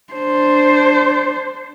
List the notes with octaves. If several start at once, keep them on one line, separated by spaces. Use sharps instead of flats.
D4 C5